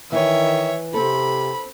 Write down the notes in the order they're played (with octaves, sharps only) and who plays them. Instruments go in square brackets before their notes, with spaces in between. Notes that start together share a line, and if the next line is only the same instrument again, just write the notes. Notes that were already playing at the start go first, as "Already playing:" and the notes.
[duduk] D#3 [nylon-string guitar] E3 E4 [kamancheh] C#5 E5
[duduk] C3 [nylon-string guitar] C4 A4 [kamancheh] B5